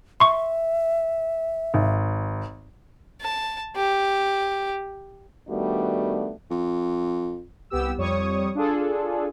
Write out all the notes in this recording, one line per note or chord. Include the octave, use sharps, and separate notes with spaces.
E5 C6 C#6
G#1
A5
G4
D#3 G3 A3 B3 D4 F#4
F2
C2 B3 G4 E6
F2 G3 C#5 C#6 D#6
D4 F4 G#4 A4